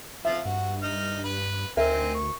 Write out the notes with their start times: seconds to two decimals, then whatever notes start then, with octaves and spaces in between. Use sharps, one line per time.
0.25 F3 F4 E5
0.45 G2 F#4
0.83 D#4 F6
1.24 B4
1.77 D2 C4 D#4 A#4 E5 G#5
2.14 C#6